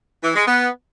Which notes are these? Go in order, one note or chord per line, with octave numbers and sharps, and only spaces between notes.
E3
G#3
B3